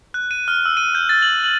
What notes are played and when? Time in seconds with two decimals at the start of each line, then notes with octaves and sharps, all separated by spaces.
0.14 F#6
0.31 D#7
0.48 F6
0.66 E6
0.77 D#7
0.95 G6
1.09 A6
1.22 F#7
1.44 F#7